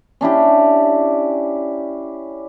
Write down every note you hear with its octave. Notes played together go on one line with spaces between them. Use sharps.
C#4 D4 E4 G4